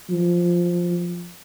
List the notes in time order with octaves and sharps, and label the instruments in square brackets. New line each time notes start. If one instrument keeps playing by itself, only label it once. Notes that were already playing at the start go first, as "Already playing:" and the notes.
[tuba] F3